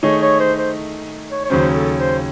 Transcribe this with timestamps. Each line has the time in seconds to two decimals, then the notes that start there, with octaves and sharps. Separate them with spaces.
0.03 D#3 A3 D#4 G#4 C#5
0.22 C#5
0.40 C5
0.58 C5
1.31 C#5
1.45 C#5
1.49 D#2 C#3 F#3 C#4 C5
1.74 A4
1.99 C5